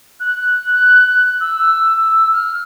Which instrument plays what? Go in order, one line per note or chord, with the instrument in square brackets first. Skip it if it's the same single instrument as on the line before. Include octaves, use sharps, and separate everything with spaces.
[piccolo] F#6
F#6
E6
F6